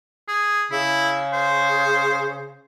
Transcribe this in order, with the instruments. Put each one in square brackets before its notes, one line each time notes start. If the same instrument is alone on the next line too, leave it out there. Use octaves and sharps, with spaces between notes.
[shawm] G#4
[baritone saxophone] C#3 [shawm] E4
[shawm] C5